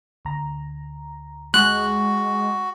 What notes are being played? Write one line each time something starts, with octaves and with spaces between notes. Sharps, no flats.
D2 A#5
G#3 F#4 F#6